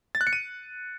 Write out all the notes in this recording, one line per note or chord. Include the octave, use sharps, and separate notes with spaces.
A6
F#6
C#7
D#7